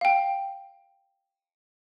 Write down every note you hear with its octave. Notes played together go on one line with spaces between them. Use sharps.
F5 G5